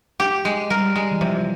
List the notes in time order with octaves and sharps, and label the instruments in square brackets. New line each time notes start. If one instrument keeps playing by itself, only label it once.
[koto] G4
G#3
[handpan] G3 [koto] A#4
[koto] G#3
[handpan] E3
[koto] C3 [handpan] F3